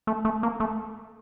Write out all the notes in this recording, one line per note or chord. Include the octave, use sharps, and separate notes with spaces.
A3
A3
A#3
A3